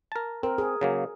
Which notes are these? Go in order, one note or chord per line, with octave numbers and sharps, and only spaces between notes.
A#4 A5
C4 A#4
G#4
C#3 F#3 A#3